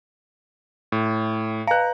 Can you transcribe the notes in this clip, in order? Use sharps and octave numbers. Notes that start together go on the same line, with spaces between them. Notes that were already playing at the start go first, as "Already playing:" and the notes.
A2
B4 F5 A#5 F#6